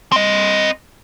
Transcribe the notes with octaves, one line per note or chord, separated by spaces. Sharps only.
C4 D#5